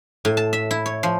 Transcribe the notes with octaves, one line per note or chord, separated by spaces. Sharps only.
A2
A5
E5
E4
C#5
F3